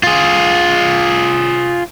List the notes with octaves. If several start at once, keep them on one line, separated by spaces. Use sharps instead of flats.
F4 G#4